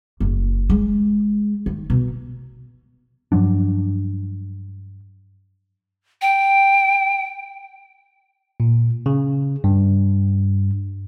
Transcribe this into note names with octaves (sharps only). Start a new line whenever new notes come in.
F#1
G#3
D#3
B2
G2 F3 F#3 D4
G5
A#2
C#3
G2